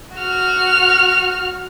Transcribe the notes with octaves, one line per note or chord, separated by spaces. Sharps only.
F#4 F6